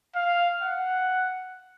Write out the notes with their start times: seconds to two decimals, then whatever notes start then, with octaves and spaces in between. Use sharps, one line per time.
0.15 F5
0.62 F#5